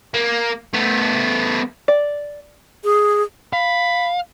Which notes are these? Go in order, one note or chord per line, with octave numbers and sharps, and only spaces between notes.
A#3
A3 B3
D5
G#4
F5 B5